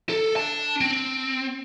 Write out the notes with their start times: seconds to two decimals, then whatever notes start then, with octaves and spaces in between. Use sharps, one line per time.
0.09 A4
0.36 D4 A5
0.81 C4